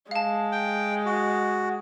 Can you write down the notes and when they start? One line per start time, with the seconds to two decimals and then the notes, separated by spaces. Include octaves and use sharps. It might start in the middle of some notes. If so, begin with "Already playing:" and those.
0.11 G#3 F5 A5
0.52 G5
1.06 F#4